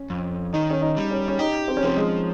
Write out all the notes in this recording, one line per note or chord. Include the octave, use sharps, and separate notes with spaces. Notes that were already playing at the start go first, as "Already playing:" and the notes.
Already playing: C#4
F2
D#3 D#4
C#4
D#4
G3
C#4
C#4
D#4 G4
C4
C#4
F3 C4
G#3